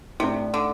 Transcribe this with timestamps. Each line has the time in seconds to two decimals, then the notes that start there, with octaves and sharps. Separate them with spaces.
0.20 A2 C3 A3 D4
0.54 D3